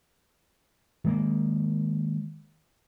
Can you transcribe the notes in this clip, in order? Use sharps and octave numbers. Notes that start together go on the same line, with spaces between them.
D#3 G#3 A#3